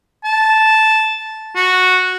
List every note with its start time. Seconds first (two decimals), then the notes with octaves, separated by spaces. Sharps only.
0.24 A5
1.56 F#4